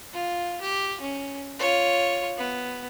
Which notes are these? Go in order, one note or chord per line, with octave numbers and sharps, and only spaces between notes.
F4
G4
C#4
F4 C#5
B3